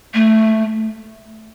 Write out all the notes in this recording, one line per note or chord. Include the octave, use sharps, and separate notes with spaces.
A3